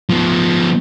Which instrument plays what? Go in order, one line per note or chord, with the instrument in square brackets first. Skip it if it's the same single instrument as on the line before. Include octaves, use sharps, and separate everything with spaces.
[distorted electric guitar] F3 B3